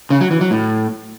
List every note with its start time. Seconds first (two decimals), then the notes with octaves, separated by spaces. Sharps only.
0.10 C#3
0.21 F#3
0.31 E3
0.41 F#3
0.51 A2